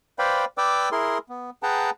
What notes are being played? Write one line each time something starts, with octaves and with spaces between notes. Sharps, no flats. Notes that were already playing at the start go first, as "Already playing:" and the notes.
B4 C5 D5 F5 G5 B5
B4 D5 G5 D6 E6
E4 G#4 A#4 C6
B3
G#4 B4 F#5 G5 A5 A#5